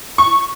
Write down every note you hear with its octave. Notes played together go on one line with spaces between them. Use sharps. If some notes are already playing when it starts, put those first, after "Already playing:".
C#6